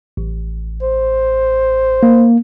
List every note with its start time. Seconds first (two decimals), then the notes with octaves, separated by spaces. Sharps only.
0.17 A1
0.83 C5
2.03 A#3